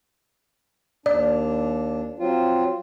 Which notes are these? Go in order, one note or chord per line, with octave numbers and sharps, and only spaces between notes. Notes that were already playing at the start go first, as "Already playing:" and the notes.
D#2 D4 D5
F#3 C4 F4